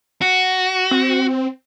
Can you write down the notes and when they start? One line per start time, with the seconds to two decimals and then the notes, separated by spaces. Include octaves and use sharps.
0.22 F#4
0.91 C4